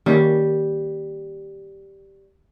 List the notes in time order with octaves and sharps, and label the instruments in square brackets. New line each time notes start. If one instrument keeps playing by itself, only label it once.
[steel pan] D#3 A#3 C#4 [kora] G3